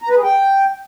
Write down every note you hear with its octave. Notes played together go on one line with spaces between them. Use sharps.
A#5
B4
G#4
G5